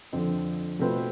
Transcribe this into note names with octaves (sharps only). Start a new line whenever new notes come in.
F2 D3 F3 C4
B2 A3 C4 F4 B4